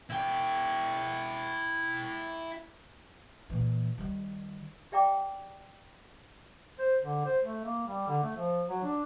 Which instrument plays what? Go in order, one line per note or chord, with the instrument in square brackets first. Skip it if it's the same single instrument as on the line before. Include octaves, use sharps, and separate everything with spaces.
[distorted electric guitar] E4 G5
[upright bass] A#2 E3
D#3 G3
[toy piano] G4 D5 E5 G5 A#5 D6
[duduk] C5
D3
C5
A3
A#3
G3
D3
A3
F3
F#3
D4